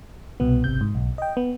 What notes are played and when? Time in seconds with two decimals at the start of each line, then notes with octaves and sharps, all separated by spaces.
0.40 C2 B2 B3
0.64 G#1 C3 G6
0.81 G#2
0.95 B1
1.18 D#5 G5
1.37 B3